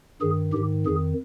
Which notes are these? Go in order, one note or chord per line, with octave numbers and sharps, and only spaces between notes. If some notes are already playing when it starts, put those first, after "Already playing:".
G2 D#3 G#4
G#2 D#3 G4
F2 D#3 G#4